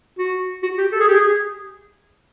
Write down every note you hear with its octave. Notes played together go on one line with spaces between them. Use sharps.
F#4
F#4
G4
A4
G#4
G4
G#4